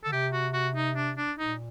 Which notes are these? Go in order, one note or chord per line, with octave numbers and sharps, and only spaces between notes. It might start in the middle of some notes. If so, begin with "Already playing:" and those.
D3 A4
C3 G4
F#4
F#4
D#4
D4
D4
A#2 D#4